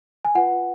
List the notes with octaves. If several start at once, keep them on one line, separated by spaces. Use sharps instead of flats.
G#5
F4 B4 F#5